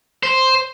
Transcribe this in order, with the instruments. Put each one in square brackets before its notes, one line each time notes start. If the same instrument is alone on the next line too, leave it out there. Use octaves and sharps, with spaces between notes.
[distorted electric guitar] C5